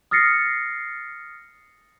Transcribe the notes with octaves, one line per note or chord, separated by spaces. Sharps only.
D#6 F6 A6 A#6 C7 C#7